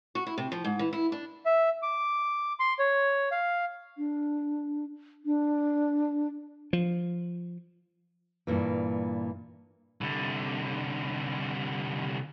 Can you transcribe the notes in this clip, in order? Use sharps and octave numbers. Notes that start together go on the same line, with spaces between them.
F#4
E4
C3
F3
G#2
E3
E4
D4
E5
D6
C6
C#5
F5
D4
D4
F3
G2 A#2 E3
C2 D3